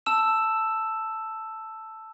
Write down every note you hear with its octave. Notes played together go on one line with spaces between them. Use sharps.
A5 E6 E7